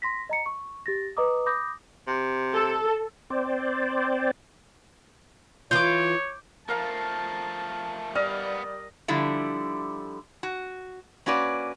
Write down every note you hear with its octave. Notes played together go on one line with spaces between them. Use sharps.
C6 A#6 B6
D#5 A#5 C#7
C#6
G4 A6 A#6
B4 D#5 A#5 D6 D#6
B5 D6 D#6 G6 A#6
C3
A4
C4 C5 D5
E3 F4 C#5 D6 G6
F3 A3 A#4 F5 A5 A#5
G3 B3 D5 D#5 F5 F6
D3 F3 G3 E4
F#4
A#3 C#4 F#4 B4 D5